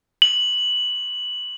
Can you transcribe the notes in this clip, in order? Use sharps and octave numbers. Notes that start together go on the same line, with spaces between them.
F#7